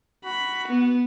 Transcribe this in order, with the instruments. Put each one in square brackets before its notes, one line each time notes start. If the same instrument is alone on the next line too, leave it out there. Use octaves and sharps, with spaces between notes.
[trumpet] F#4 [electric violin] B5
[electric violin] B3